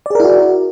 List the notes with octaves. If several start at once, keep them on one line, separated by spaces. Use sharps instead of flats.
E4 F#4 G#4 A#4 D5